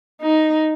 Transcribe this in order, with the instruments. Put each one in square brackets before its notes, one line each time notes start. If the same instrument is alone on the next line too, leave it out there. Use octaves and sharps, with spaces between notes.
[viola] D#4